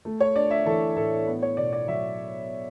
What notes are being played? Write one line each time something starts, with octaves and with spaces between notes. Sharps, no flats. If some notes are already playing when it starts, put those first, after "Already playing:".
A3
C#5
D4 D5
E5
E3 A4
A2 A4
B3
C#5
B2 D5
D5
F#3 E5